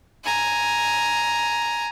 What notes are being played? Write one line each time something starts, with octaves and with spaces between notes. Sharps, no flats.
G#5 A#5